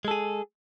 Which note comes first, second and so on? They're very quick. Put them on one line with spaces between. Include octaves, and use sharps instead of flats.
G#3 A4 G#4